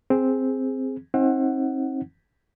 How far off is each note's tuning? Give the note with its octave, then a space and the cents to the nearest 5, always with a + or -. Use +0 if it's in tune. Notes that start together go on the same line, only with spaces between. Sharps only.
C4 +0 G#4 +0
C4 +35 D#4 +30 F#5 +0